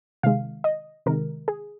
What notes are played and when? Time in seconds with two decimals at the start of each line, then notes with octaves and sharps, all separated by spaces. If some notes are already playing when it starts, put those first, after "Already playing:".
0.23 C3 D#3 G#3 F5
0.64 D#5
1.06 C3 D#3 G#3 A#4
1.48 G#4